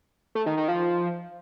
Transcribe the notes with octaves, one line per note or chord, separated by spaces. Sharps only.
A3
D#3
D#3
F3